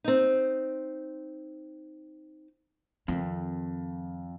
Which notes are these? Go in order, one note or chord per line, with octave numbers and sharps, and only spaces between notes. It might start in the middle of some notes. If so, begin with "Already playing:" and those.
C4 D#4
F2 D#3 C4